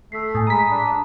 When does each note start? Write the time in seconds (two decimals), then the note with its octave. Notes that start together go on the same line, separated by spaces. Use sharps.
0.12 A3 E6 B6 C7
0.35 A2 G#5 D#6
0.47 G#3 A#5 B5 D#6 B6
0.70 D4